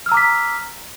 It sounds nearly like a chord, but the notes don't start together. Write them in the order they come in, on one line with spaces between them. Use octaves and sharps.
F6 E6 A#5 D6 B6